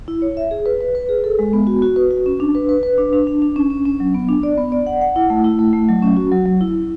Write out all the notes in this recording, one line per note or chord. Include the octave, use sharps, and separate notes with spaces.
E4
C#5
E5
G#4
B4
B4
B4
G#4
A4
G#3
B3
F#4
F#4
B4
F#4
C#4
D4
B4
B4
B4
D4
D4
D4
D4
C#4
C#4
C#4
F#3
B3
D4
D5
B3
D5
F#5
F#5
E4
A3
E4
A3
A3
F#3
C#4
F#4
F#3
F#3
E4
E4